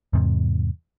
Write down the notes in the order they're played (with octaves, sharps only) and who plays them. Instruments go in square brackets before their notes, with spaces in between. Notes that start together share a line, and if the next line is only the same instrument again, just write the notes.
[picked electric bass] E2 G#2 C3